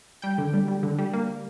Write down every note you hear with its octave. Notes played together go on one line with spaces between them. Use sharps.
G3 G5
D3
G3
G3
D3
G3
A#3